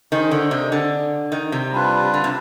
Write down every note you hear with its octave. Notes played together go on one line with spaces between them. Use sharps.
D#3 D#4 G#4 C5 D#5
D3
C3
D3
D#3
C3
G3 D4 F4 B4
D3
C3